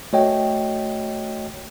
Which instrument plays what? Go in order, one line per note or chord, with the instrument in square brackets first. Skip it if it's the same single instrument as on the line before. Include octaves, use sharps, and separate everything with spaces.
[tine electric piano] A3 F#4 C#5 D#5 G5